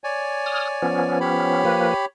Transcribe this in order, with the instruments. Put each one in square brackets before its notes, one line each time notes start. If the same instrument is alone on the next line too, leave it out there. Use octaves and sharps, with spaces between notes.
[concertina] C#5 D5 G#5
[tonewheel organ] D#6 F6
F3 B3 C#4
[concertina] G4 C#5 B5
[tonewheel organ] F3 A#3 B4